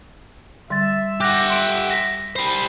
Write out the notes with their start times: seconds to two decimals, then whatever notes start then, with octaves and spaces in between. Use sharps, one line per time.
0.70 D3 G3 E5 C6 A6
1.21 G4 F#5 D6 F#6 A#6
1.50 C6 D7
1.91 A#6 B6
2.36 G3 C5 B5